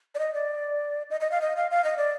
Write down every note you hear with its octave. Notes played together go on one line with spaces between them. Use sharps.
D5
D#5
D5
D#5
D#5
F5
D#5
F5
F5
D#5
D5